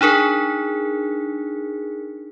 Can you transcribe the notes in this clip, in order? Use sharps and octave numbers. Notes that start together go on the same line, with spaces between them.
D4 D#4 G#4 A#4